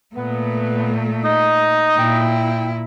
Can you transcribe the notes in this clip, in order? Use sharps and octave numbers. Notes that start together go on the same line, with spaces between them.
A#2 A3 B3
D#4 D#5
A#2 E4 G5